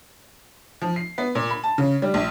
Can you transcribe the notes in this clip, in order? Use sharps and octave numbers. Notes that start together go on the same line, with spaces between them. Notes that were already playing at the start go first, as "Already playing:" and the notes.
F3
C7
B3
A#2
B5
A5
C#3
G3
A#1